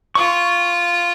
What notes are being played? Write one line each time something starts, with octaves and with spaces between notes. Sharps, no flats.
F4 C#6